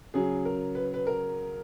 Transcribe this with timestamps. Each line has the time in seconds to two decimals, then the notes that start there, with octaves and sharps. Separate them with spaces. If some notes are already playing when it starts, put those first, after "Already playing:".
0.14 C#3 F#3 G#4
0.45 A#4
0.75 B4
0.94 B4
1.07 A#4